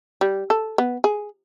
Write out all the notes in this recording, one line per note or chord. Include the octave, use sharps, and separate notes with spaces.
G3
A4
B3
G#4